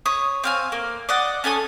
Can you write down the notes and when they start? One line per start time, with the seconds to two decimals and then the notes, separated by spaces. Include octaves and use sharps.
0.06 C#5 D#6
0.44 C4 F5 G#5
0.72 A#3
1.09 D5 D#5 F#5
1.44 C#4 A4 G#5 D#6